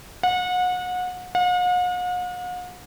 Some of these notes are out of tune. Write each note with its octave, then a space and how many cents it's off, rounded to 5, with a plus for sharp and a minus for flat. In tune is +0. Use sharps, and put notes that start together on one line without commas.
F#5 -30
F#5 -45